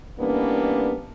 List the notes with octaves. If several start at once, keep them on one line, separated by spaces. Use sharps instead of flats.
E3 G3 A#3 B3 C#4 D4